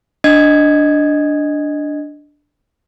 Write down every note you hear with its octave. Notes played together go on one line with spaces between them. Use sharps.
D4 D#5 G#6